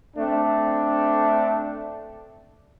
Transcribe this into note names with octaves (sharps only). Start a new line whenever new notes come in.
A3 C4 D4